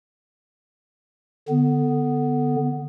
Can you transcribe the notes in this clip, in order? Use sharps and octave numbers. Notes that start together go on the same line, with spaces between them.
D3 B3